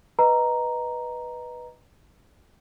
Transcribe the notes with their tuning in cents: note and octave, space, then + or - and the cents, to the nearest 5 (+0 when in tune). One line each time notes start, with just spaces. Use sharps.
B4 -5 D#5 +0 A#5 +0